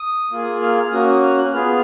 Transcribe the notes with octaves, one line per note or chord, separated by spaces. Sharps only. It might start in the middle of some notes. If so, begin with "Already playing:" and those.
Already playing: D#6
A#3 F4 G#4
F6
F6
A#3 C#4 F#4 D#6
D#6
F6
F#6
B3 F4 G#4 F6
F6